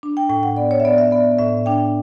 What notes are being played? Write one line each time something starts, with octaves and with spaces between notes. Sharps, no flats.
D4
G5
A2 G5
F#5
B3 D5
C#5
E5
B3 D5
E5
B3 D5
A2 E5
D4 G5